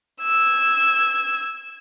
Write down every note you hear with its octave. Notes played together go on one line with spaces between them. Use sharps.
E6 G#6